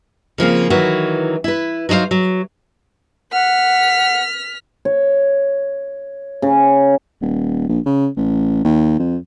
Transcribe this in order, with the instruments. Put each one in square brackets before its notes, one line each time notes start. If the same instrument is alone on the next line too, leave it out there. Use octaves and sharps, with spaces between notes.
[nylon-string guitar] C#3 F3 A#3 C4
D#3 E3 F#3 E4 F#4
E4 B4
F#3 D#4 E4 C5 F5
F#3
[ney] F#5 [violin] F6 B6
[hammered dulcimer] C#5
C#3
[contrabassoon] D#1
A#1
C#3
A1
D#2
F2